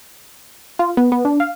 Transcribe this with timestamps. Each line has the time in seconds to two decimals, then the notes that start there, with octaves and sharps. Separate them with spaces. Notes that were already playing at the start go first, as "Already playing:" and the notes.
0.79 F4
0.97 B3
1.12 B3
1.25 D4
1.40 F5